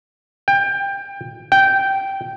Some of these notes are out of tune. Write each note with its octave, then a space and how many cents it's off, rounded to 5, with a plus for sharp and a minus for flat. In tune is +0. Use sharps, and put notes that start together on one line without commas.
G5 +20
G5 -10